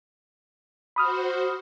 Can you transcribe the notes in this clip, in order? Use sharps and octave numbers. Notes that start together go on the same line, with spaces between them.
F#4 C5 B5 D#6 F6